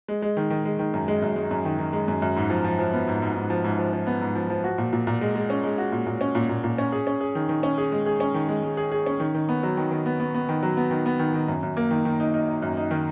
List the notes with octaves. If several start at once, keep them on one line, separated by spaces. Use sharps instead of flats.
G#3
G#3
D#3
D#3
G#3
D#3
F#2
G#3
F#2
G#3
F#2
D#3
D#3
G#3
F#2
F#2
G#2
F3
F3
F3
B3
G#2
G#2
G#2
F3
G#2
F3
F3
B3
G#2
F3
F3
F#4
A#2
A#2
A#2
G#3
G#3
C#4
G#3
F#4
A#2
A#2
C#4
A#2
A#2
A#2
C#4
G#4
C#4
G#4
D#3
D#3
C#4
G#4
G#3
G#4
C#4
D#3
G#3
G#3
G#4
G#4
C#4
D#3
D#3
B3
F#3
D#3
D#3
B3
B3
B3
D#3
F#3
B3
D#3
B3
D#3
D#3
F#2
F#2
A#3
D#3
D#3
D#4
D#4
D#4
F#2
D#4
D#3